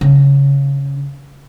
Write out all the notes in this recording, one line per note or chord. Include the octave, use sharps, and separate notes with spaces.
C#3